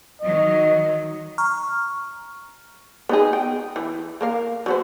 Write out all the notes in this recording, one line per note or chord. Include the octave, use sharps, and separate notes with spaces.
D#3 F#3 D#5
A#5 C#6 F6
B3 D#4 G#4
G5
E3
A#3 A#4 F5
F#3 B3 C5